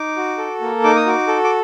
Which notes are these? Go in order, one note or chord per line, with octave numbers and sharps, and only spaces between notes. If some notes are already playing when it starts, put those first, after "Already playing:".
Already playing: D#4 D6
F#4
A4
A#3
D#4 D6
D#6
F#4 D6
A4
D6